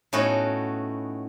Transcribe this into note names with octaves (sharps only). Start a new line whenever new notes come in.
A2 B3 C#4 D#4 F#4